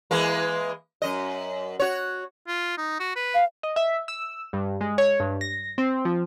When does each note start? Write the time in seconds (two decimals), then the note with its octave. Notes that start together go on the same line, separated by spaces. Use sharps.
0.11 E3 G#3 A#3
1.02 F#2 D#5
1.80 F#4 C#5
2.47 F4
2.78 D#4
3.00 F#4
3.16 B4
3.34 F5
3.63 D#5
3.76 E5
4.08 E6
4.53 G2
4.81 G#3
4.98 C#5
5.20 G2
5.41 A#6
5.78 C4
6.05 F3